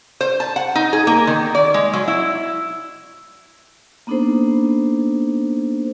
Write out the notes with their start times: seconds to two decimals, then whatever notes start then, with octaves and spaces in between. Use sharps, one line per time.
0.21 C5
0.40 A5
0.56 F#5
0.75 D#4
0.93 G#4
1.07 A#3
1.27 D#3
1.55 D5
1.74 G#3
1.93 F#3
2.08 E4
4.07 A#3 B3 D4 D#4 A4 C5